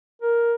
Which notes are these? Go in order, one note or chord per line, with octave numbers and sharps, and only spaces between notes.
A#4